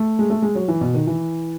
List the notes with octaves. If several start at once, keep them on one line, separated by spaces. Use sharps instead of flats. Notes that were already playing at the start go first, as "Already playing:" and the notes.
Already playing: A3
G#3
A3
G#3
F#3
E3
B2
D#3
E3